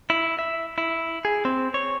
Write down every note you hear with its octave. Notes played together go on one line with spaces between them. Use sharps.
E4
E5
E4
G#4
C4
C#5